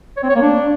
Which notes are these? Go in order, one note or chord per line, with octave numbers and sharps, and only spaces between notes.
C#5
C4
C#5
A#3
D4